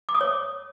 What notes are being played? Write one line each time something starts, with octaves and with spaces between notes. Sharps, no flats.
D6
D#6
C#5